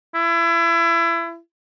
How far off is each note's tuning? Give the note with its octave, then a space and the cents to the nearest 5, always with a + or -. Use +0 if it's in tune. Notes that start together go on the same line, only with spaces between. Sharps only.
E4 +30